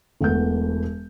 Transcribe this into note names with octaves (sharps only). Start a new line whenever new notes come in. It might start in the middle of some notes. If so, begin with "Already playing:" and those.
E1 A3 B3 G6